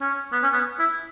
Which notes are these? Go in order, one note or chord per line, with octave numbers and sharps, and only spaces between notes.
C#4
B3
C#4
B3
E4